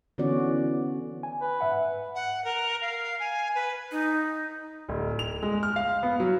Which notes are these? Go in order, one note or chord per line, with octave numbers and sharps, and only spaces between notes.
D3 E3 B3 C#4 F#4 D5
G#5
B4
G#2 E5 F#5
F#5
A#4
F5
G#5
B4
D#4
D1
F7
G#3
F6
F5
B3
F#3